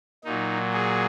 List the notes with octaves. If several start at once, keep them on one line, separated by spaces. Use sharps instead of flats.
A#2 F#3 D#4
G#4